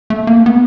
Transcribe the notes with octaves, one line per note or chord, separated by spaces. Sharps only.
A3
A#3
B3